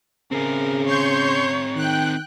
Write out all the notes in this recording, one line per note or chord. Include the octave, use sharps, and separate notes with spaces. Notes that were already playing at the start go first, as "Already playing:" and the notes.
C#3 C4 G#4 A#4
C#5 C6 C#6 G6
D#3 G5 F#6